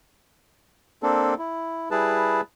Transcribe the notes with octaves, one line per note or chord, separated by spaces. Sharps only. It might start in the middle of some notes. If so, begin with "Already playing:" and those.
A#3 C4 D4 A4
E4
G3 E4 G#4 B4 A5